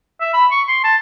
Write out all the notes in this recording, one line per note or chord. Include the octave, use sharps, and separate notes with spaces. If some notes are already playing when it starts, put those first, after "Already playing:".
E5
B5
C#6
C6
A5